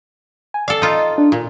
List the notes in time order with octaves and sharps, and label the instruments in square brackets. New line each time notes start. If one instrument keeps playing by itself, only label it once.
[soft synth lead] G#5
[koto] A4 F5 [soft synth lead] D5
[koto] D#4 F4 [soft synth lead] D#5
[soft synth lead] D4
[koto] A#2 [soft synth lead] F4